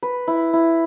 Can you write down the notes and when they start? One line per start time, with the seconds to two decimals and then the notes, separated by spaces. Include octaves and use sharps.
0.03 B4
0.28 E4
0.53 E4